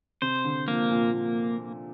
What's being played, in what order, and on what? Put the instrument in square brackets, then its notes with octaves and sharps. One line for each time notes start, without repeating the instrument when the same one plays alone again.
[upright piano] C3 [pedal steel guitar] C5
[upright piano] D3
[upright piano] F3 [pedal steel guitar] A#3
[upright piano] A#2